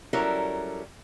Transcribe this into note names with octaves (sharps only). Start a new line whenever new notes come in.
F#3 G3 C#4 E4 A4 A#4